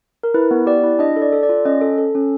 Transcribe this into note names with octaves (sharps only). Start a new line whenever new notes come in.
A#4
E4 B4
B3
G4 D5
E4
D4 D#5
A4
D5
A4
D5
F4
C#4 D#5
A4
A4
C#4